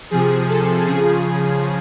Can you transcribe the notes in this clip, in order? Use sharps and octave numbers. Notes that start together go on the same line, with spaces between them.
C3 F3 G#4
A4
C#3 F3 G#4